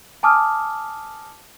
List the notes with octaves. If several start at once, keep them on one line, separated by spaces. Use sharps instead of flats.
G#5 A5 D6 D#6 F6